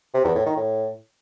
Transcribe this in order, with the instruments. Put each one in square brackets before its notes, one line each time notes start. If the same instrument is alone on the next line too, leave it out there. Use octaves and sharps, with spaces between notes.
[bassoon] C3
E2
A2
D#3
A2